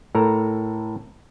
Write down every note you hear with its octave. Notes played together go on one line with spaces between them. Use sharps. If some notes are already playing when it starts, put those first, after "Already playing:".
A2 A4 A#4 A#5